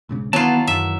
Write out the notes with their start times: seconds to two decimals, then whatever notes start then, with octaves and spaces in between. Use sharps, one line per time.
0.09 B1 G#2 C#3
0.33 D#3 E3 F#3 B3 F4 A5
0.67 F#2 E5